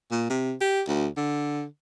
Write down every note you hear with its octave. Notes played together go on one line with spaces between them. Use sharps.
A#2
C3
G4
D2
D3